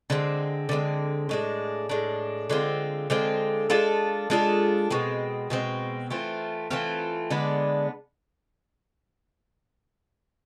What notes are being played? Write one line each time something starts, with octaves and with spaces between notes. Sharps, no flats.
D3 G#3 C4
D3 G#3 C4
A2 G#3 D4
A2 G#3 D4
D3 G#3 C4 F4
D3 G#3 C4 F4
G#3 D4 F4 A4
G#3 D4 F4 A4
B2 G#3 C4
B2 G#3 C4
E3 A3 C4 F4
E3 A3 C4 F4
D3 G#3 B3 D4